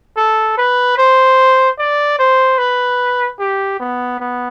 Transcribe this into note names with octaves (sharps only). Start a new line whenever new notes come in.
A4
B4
C5
D5
C5
B4
G4
B3
B3